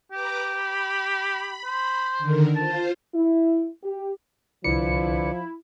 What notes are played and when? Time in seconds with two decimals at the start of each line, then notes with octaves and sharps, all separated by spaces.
0.12 G4 B4 A#5 D6
0.54 B5
1.65 C5
2.19 D3 D#3 A#4
2.56 F4 C5 A5
3.14 E4
3.83 G4
4.64 C2 D3 F3 E4 B4 D5 C#7